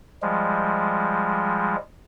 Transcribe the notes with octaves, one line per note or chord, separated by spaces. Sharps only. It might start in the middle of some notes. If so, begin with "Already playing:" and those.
F3 G3 G#3